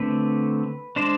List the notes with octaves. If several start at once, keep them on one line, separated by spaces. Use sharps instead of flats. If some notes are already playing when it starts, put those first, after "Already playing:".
Already playing: D3 A3 C4 B4
G#3 D4 C5